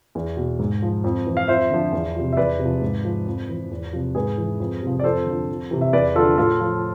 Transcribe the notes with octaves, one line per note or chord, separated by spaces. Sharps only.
E2
B2
G#2
F3
F2
E3
F5
F2 C5 E5
D3 F3
E2
C3 F3
E5
E2 B4 D5
C3
F3
G#2
F3
F2
E3
E2
C3 F3
G#2 G#4 B4
E3
F2
C3 F3
D5
F2 A4 C5
D3 F3
F2
C3 E3
E5
E2 B4 D5
D3 F3 F4 A4
A2 F4 A4
F3